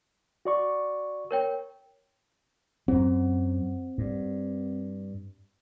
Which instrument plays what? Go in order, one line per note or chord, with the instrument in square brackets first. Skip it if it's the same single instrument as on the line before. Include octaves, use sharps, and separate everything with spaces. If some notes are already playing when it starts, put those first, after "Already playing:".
[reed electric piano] F#4 D5 C#6
[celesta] A#4 C#5 G5
[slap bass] F#2 F#3 [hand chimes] C4
[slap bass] G2